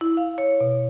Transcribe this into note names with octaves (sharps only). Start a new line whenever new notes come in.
E4
F5
C#5
B2